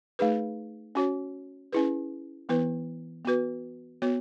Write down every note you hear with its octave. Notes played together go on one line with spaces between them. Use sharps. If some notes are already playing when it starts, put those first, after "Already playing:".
A3 D#4 G#4 B4
C#4 F#4 C#5
C#4 E4 G#4 B4
E3 B3 E4 B4
B3 F#4 B4
B3 F#4 C#5